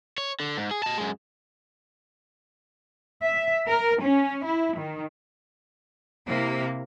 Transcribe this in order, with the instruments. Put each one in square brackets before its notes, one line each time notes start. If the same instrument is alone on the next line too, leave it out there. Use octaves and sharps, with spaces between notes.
[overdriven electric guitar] C#5
D3
G#2
G#4
D#5 A5
F#2 G#3
[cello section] E5
A#4
C#4
E4
D#3
C3 A#3 E4